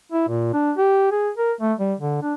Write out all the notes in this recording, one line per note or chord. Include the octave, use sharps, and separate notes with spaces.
E4
A#2
D4
G4
G#4
A#4
A3
G3
D3
D4